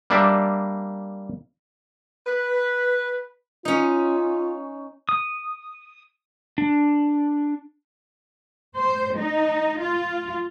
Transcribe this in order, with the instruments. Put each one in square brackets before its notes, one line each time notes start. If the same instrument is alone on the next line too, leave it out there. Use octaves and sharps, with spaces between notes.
[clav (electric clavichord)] G3 A#3 D4 D5 E5
[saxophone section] B4
[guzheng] C#4 D#4 [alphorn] F4
[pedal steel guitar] D#6
D4
[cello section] C5
D#4
F4